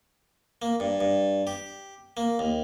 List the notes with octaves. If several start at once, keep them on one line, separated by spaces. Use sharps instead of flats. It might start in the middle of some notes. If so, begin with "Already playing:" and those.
A#3
G2
G2
G4
A#3
D#2